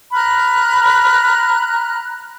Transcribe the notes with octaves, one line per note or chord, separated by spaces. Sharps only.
A#5 B5 F6 F#6